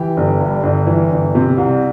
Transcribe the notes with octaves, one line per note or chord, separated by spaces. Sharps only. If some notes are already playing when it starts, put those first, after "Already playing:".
Already playing: E3 G4
G1
G2
G1
E3
G1
C3
C2